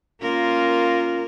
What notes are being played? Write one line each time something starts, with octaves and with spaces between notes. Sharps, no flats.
A#3 C#4 F4 A#4